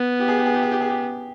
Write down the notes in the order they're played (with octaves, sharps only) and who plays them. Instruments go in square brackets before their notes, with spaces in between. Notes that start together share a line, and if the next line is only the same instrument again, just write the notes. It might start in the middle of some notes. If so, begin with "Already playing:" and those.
Already playing: [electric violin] B3
[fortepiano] G4
G#4
G4
G#4
G4
G#4
G4
G#4
G4